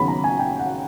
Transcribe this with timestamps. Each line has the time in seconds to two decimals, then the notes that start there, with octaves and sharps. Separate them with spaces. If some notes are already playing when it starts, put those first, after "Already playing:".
Already playing: D#2 C#3 F#3 B3 B5
0.08 A#5
0.24 G#5
0.39 G5
0.59 F#5